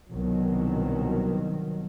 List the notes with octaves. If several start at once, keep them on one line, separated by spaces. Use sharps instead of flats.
C2 B2 D#3 F#3